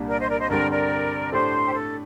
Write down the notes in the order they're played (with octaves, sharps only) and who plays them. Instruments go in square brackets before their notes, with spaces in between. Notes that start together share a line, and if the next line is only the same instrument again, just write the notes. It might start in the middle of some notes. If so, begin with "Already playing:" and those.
Already playing: [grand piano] C2 A#2 G3 D4
[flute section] A#4 D5
C5 D#5
A#4 D5
C5 D#5
[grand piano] G2 D3 G3 C4 [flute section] A#4 D5
[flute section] A#4 D5
[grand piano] A2 A3 D4 G4 [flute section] C5
[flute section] G4
A4